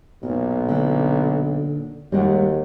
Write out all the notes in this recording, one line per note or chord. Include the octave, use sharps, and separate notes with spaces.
B1 A#2
A#2 D3 C#4
D#2 G3 G#3 F#4